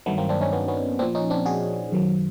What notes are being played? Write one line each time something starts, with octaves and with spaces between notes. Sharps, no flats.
G2 D#3 F#3 A3 B3
A#3 C4
C4 D4
C#4 D#4
B3 C#4
B3 C#4
A#2 F3 C4 D4
C#4 D#4
C4 D4
F#4 G#4
F#2 D#3 F#3